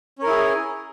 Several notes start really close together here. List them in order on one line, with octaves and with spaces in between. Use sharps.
C#4 A#4 E4 G#4